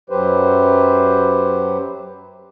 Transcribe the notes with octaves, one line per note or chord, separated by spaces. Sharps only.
F#2 F#3 G4 B4 C5